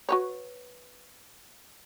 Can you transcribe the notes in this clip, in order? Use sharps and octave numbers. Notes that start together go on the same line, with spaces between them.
F#4 B4 C#5